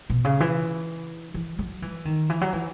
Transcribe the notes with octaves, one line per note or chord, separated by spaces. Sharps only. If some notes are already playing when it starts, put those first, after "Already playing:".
B2
C#3
E3
E3
F#3
E3
D#3
E3
F#3
E3